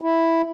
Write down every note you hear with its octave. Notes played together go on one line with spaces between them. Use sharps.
E4